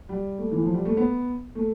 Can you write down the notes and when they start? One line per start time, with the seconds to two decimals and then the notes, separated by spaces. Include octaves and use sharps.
0.09 G3
0.38 A3
0.51 E3
0.62 F3
0.74 G3
0.85 A3
0.97 B3
1.55 A3